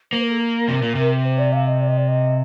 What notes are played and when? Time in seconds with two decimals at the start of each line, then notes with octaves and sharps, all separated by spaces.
0.12 A#3 C5
0.21 A#4
0.30 A4
0.39 A#4
0.68 C3
0.82 A#2
0.95 C3
1.24 C5
1.38 D5
1.53 F5
1.67 D#5
1.81 D5
1.88 D#5
1.97 D5
2.08 D#5